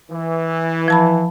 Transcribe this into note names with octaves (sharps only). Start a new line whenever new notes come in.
E3
F3 A5 B5